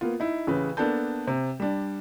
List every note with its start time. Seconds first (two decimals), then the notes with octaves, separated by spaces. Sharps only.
0.01 A#3 B3 F4
0.20 D#4 E4
0.47 A1 C#3 B4
0.77 A#3 B3 D4 A4 A5 G6
1.27 C3
1.60 G3 D4